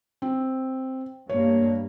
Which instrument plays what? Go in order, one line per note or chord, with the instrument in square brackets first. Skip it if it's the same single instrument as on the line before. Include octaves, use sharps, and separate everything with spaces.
[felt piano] C4
[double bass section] G2 A#3 [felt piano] C#5